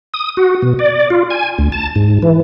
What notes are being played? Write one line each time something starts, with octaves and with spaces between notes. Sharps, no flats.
D#6
F#4
B2
D5
F4
G#5
D2
A5
G#2
E3